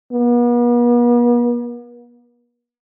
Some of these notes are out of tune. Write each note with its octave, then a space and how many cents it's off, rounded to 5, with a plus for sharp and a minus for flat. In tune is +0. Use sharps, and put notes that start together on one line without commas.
B3 -45